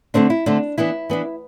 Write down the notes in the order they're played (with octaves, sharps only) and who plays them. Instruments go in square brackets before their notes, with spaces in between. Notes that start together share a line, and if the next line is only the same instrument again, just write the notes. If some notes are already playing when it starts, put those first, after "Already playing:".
[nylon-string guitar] D3 A3 C4 D4
E4
D3 A3 C4 D4
E3 B3 D4 E4
E3 B3 D4